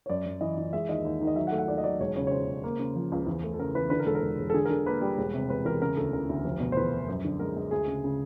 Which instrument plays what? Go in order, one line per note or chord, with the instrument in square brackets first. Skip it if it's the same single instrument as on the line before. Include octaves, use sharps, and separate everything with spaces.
[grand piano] C#5
F#2 D5
F#2
E3 D#5
E3
G#3 E5
D#2 D#5
D#2
D#3
D#5
F#3 E5
F#5
A3
F#5
D#2 D5
D#5
F#3 D5
E1 C#5
C#3 C#5
C#5
C#3 C5
C#3
A#3
C#3
F3
C#2
E2
A3
A4
C#3 A#4
E3 B4
D3 B4
A#4
E1 A4
A#4
E1
E1
A4
D3 G#4
A#4
D3 A4
A#3 B4
G3
E1
C3
E1 B4
E2 A#4
C#3 A#4
D2 A4
C#3 A#4
D2
F1
B2
C5
E2 B4
F1
F#2
D3
G#3 A#4
G#3
D2 G#4
C#3
C#3